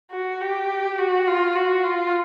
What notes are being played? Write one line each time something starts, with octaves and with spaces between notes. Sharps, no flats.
F#4
G4
F#4
F4
F#4
F4